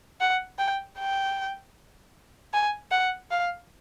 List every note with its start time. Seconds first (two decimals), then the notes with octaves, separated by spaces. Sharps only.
0.21 F#5
0.59 G5
0.98 G5
2.53 G#5
2.91 F#5
3.31 F5